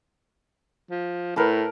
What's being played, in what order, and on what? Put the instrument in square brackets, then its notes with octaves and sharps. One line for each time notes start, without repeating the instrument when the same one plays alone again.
[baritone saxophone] F3
[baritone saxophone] A2 [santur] A#4 B4 A5